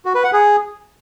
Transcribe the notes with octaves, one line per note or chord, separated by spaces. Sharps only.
F#4
B4
F#5
G#4